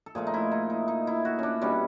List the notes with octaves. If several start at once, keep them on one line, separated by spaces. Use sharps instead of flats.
A4
A#2 F3 A3 G#4
D#4
E4
D#4
E4
D#4
E4
F#4
C#4 D4
B2 G3 C#4